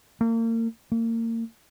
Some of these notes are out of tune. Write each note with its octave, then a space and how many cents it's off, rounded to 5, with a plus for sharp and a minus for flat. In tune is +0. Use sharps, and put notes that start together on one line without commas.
A#3 -35
A#3 -35